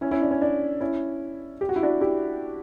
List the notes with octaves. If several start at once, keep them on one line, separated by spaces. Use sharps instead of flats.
C#4 E4
C#4 E4
D4
C#4
D4
C#4 E4
G4
F#4
E4
D4 F#4
E4 G4